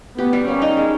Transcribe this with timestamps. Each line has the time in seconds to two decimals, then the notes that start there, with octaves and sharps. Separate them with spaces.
0.18 B3 G4
0.33 G3
0.47 A#3 C#4
0.62 D#4
0.77 G#3